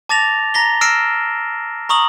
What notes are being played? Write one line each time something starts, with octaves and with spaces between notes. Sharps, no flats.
A5 D6 A6 A#6 F7
A#5 A#6 B6 G7
E6 F6 A#6 C7 D7 E7
A#5 C#6 D#6 F#7